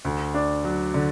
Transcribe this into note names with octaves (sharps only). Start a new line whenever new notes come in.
D2
D4
F#3
D3